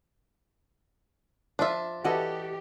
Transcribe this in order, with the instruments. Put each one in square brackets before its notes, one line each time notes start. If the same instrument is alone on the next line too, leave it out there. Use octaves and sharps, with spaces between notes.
[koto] F3 F4 [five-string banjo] D4 E5
[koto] E3 D5 D#5 [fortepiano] F#4 A4 [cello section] G4